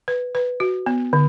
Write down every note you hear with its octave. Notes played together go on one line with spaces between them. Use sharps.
B4
B4
F#4
B3
D3